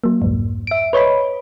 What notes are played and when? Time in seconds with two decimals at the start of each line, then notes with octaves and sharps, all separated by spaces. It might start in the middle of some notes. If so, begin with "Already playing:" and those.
0.04 F#3 A#3
0.22 C2 F2 G#2
0.67 E5 D7
0.93 B4 C#5 D#5 B5